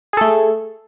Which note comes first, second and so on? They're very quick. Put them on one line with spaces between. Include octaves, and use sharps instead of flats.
G#4 A4 A3